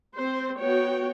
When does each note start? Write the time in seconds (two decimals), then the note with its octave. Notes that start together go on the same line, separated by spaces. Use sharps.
0.16 C4 C5
0.59 B3 F#4 C#5 G5